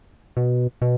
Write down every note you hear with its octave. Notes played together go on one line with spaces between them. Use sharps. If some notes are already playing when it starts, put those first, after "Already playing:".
B2
B2